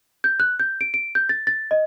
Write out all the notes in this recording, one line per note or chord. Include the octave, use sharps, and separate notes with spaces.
G6
F#6
G6
D7
D7
G6
A6
A6
D#5